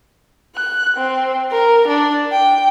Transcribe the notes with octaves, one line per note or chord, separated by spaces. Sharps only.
F#6
C4
A#4
D4
G5